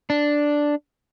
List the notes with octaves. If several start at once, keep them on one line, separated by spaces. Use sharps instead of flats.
D4